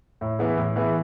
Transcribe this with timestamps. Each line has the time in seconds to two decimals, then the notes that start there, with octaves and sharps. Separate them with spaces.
0.21 A2
0.39 E3 B3 E4 G#4
0.58 A2
0.76 E3 B3 E4 G#4